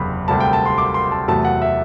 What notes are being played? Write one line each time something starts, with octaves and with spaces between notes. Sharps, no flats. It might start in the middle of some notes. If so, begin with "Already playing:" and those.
Already playing: F#1 E2 C3 B5
D2 C3 G3 A5
G5
A5
C6
D6
C6
A5
E2 C3 F#3 A3 A5
F#5
E5